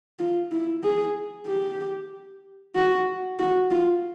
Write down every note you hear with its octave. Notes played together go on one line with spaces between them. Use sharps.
F4
E4
G#4
G4
F#4
F#4
F4